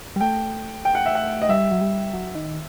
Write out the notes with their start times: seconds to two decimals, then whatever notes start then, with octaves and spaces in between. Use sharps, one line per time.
0.16 G3
0.21 A3 G5
0.85 G5
0.95 F#5
1.06 E5
1.15 F#5
1.42 D#5
1.49 G3 E5
1.72 F#3
1.81 G3
2.13 F#3
2.35 D#3